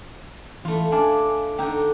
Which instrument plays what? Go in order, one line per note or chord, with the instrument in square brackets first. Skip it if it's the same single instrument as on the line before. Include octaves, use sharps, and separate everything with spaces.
[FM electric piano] E3 [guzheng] A3 F4
[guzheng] D4 [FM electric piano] F5 G#5 A5
[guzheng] D3 D#4 [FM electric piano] G5